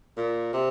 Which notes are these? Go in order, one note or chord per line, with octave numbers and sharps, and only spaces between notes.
A#2
C3